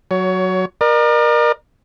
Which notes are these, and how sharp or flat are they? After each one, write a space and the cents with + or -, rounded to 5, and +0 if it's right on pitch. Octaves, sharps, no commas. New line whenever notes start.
F#3 +0 C#5 +25
A#4 +20 D5 +45